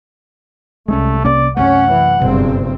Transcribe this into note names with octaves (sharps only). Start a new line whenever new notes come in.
C2 G#3 A3 C4 C#4
C3 A#3 C#4 D5
F#2 C3 A3 C#4 F#5
E3
F#1 G2 B2 C4